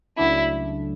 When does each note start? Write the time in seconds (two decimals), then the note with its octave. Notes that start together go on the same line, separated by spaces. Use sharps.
0.18 C#2 C#3 F#3 A3 D4 E4